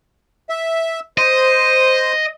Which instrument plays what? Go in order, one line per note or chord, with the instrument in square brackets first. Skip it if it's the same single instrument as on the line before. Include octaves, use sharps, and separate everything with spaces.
[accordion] E5
[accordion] C5 [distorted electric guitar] D#5